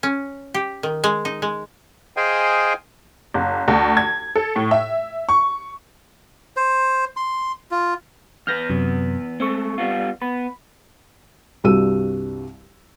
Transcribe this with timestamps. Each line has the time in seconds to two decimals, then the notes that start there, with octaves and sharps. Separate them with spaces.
0.03 C#4
0.54 G4
0.83 D#3
1.04 G#3
1.25 D#4
1.42 G#3
2.17 G#4 C5 D#5 F5 G5 G#5
3.34 F#1
3.68 D2
3.97 G#6
4.36 A4
4.56 A2
4.71 E5
5.29 C#6
6.57 C5
7.17 C6
7.71 F4
8.47 E2 B3 B4 F6 G6 A#6
8.70 F#2 C3 F#3
9.40 G#3 A3 C4 C#6
9.78 G3 B3 F4
10.22 B3 B5
11.64 C2 G2 F#4 E6 D#7